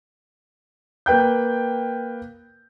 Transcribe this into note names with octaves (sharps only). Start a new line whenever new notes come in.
A#3 B4 G5 G6